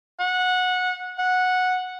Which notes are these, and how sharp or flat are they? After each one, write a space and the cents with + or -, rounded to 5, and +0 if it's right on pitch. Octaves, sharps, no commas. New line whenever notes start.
F#5 -20
F#5 -10